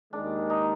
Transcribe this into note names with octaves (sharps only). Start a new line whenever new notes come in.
D#2 D#3 G#3 D4
D#4